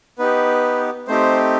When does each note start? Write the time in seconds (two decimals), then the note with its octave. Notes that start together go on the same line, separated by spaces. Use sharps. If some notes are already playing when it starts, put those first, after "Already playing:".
0.18 B3 D#4 G4 B4
1.08 A3 C4 D#4 G4 C5